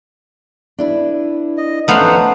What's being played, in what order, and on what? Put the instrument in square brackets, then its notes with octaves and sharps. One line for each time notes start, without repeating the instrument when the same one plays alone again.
[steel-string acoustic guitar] D4 E4 B4
[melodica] D#5
[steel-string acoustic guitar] F2 C#4 [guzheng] A3 B3 F5 [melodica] D#4 C5 F#5